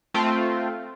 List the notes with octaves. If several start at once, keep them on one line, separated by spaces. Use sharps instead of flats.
A3 C4 F4